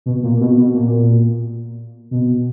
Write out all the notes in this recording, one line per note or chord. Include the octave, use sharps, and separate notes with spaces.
B2
A#2
B2
B2
A#2
B2